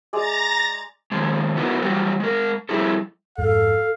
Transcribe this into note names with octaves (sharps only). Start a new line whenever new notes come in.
G#3 G#4 D5 A#5 A6 A#6
D#3 F3 G#3
B3 D#4 E4 F#4 A#4 B4
E3 F#3 G3 F4 F#4
G#3 A#4
F2 C3 G3 E4 G#4 A4
F2 G#2 A4 F5